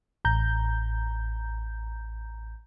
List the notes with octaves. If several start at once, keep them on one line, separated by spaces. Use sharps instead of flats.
A1 A#5 G6